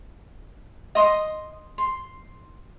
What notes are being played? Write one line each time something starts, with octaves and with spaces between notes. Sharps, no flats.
D#5 C6 D#6
C6